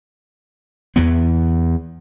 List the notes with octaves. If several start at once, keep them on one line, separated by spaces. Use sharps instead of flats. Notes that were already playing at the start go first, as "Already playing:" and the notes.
E2 E3 B3